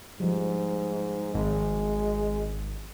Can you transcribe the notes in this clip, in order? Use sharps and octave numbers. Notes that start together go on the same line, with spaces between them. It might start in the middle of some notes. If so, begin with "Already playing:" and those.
G#2 F3 G3
G#1 G#3